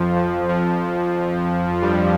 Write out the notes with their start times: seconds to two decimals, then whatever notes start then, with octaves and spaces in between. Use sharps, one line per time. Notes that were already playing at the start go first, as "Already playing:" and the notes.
Already playing: F2 F3
0.16 F2 F3
0.48 F2 F3
1.82 G2 G3